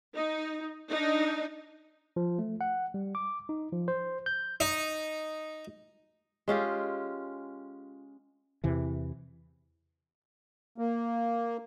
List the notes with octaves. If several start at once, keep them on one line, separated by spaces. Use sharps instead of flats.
D#4
D4 D#4
F3
A3
F#5
G3
D6
D#4
F3
C5
G6
D#4
G#3 C#4 F4 G4
E2 C3 E3
A#3